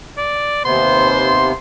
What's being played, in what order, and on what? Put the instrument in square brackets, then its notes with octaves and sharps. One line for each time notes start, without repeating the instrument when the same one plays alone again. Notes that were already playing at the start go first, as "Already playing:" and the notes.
[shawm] D5
[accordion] D#2 C3 B3 [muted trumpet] C5 [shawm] C6